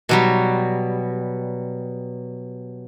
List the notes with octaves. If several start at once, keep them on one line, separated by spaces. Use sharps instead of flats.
B2 F#3 G3